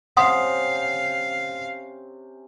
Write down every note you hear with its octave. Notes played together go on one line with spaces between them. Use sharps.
C3 C#4 F5 F#5 C6 D#6